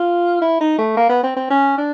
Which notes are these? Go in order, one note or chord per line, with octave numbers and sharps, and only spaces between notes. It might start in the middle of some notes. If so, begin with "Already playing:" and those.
Already playing: F4
E4
D#4
A3
A#3
B3
C4
C4
C#4
D4